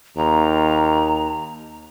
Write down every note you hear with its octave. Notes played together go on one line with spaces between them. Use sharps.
D#2 A#5